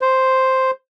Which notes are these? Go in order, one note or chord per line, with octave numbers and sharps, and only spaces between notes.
C5